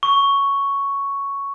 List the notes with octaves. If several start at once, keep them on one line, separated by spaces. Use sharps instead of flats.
C#6